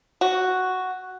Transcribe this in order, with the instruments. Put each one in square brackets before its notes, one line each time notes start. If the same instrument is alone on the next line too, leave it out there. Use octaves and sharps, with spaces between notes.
[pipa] F#4